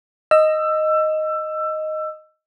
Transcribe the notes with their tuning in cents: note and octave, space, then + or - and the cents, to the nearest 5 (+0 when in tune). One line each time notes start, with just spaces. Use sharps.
D#5 +0 E6 +20